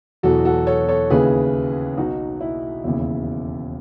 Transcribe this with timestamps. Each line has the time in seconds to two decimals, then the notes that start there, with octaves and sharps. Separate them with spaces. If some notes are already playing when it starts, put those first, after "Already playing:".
0.23 E1 E2 B2 F#3 F#4 A4
0.45 F#4 A4
0.67 A4 C#5
0.89 A4 C#5
1.10 D#2 C#3 E3 G#4 B4
1.98 B1 B2 F#3 D#4 F#4
2.41 E4
2.84 E1 D#2 C#3 E4